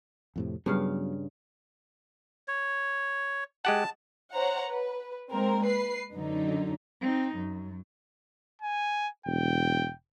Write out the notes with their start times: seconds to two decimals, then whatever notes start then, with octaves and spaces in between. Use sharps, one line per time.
0.36 F2 A2 C3
0.66 G2 C#3 F#3 B3 C#4 F5
2.48 C#5
3.65 G#3 G4 F#5 A5
4.33 C5 C#5 F#5 A#5
4.70 B4
5.31 G#3 A#3 C4 A#4
5.65 B4 C7
6.14 F#2 D3 F#3 D#4
7.01 C4 D#4
7.35 F#2
8.62 G#5
9.26 E1 G5